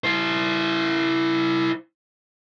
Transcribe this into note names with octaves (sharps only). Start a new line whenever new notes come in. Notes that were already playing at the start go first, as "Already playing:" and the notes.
E4 C5